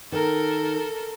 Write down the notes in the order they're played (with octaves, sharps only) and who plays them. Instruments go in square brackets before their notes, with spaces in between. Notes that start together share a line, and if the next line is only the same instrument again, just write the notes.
[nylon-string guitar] D#3 [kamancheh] A4 A#4